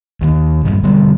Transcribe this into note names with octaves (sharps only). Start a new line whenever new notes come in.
D#2 D#3
A#1 G2
E1 D3 G3 B3